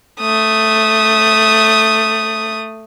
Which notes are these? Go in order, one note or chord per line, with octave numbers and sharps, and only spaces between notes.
A3 D#6